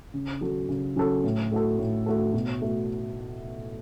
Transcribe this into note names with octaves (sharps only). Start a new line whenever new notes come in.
C#3
F#3 C#4 F#4 A4
C#3
F#3 C#4 F#4 A4
A2
A3 F#4 A4
A2
A3 F#4 A4
B2
A3 F#4